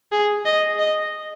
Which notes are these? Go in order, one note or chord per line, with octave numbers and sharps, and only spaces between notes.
G#4
D#5
D#5